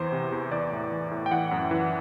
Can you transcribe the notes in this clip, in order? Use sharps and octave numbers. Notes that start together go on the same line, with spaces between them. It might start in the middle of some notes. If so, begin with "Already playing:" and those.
Already playing: E2 E3 C5
C3
E2
E3 D5
A2
E3
A2
G5
E3 F#5
F#2
E3